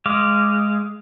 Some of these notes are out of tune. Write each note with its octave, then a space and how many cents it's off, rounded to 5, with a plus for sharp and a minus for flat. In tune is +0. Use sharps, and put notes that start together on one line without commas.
G#3 +0 F5 -20 D6 +0